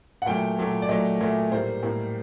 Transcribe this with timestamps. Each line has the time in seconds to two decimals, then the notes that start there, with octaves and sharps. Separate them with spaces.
0.22 F#5
0.26 A#2 F#3 A3 G5
0.59 A#2 F#3 A3
0.82 D5
0.89 A#2 F#3 A3 D#5
1.21 A#2 F#3 A3
1.51 A2 G3 A#3 C5
1.83 A2 G3 A#3